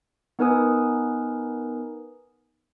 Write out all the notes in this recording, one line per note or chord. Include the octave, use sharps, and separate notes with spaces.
B3 D#4 A#4 B4 G#5 D#6